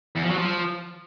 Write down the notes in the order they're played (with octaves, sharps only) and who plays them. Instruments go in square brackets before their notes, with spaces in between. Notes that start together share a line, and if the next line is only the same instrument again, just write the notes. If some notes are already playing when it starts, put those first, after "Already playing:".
[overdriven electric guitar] E2
F3
F#3
F3